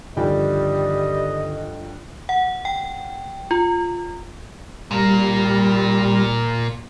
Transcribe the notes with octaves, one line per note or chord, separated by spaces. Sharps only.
G1 D3 D#3 F3 G3 D#5 G5
F#5
G5
F4
A#2 G3 A#3